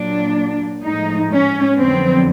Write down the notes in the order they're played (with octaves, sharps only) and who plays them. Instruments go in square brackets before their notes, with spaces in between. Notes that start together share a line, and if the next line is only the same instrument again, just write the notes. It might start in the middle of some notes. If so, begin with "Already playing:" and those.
Already playing: [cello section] A#2 F#3 A#3 D4
A2 F3 G#3 D#4
C#4
F2 D3 F#3 B3 C4